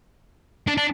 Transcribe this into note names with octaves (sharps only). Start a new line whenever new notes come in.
D4
D4